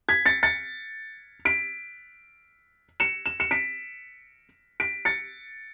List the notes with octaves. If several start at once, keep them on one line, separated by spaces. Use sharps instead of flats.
G#6 B6
A6 C#7
A6 C#7
B6 D7
C#7 E7
E7
C#7 E7
B6 D7
B6 D7
A6 C#7